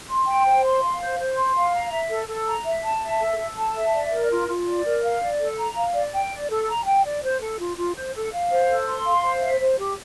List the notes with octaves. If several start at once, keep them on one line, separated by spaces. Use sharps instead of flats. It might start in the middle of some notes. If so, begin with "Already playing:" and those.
C6
G5
C5
C6
F5
C5
C5
C6
F5
A#5
E5
A4
A4
A#5
E5
A5
E5
A4
A4
A5
E5
D5
A#4
F4
F4
D5
A#4
F5
D5
A4
A#5
F5
D5
G5
D5
A4
A#5
G5
D5
C5
A4
F4
F4
C5
A4
F5
C5
A4
C6
F5
C5
E5
C5
G4